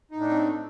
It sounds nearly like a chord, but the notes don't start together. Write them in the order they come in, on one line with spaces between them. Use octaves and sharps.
D#4 A2 D4 A3 C4